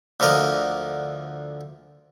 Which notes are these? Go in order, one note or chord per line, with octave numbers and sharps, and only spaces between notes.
D2 D3 F3 A#4 D#5